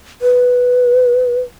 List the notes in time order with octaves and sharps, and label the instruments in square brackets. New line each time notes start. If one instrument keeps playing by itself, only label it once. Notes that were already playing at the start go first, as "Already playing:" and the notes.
[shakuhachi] B4